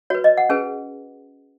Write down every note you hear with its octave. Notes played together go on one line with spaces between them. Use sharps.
F#4 B4 C#5
D#5
F#5
C#4 G#4 B4 G#5